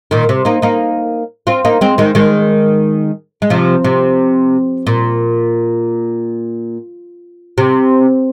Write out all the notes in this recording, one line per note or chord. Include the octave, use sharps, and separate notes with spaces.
A#2 D#3
C3
A#3 D#4
A#3 D#4
C4 F4
A#3 D#4
G#3 C4
D#3 G#3
D#3 G#3
G#3
C3 F3
C3
A#2
C3